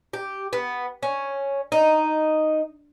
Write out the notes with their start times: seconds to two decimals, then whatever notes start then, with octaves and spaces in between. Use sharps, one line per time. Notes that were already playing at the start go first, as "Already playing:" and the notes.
0.13 G4
0.53 B3
1.03 C#4
1.72 D#4